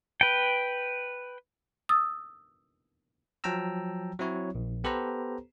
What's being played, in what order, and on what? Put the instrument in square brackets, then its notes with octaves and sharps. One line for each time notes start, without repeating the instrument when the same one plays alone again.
[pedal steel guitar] B4 G5
[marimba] D#6 E6 A6
[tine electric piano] F3 F#3 G5 A5 A#5 E6
F#3 C4 E4 C#5
A#1
B3 G4 A4 B4 C5 A#5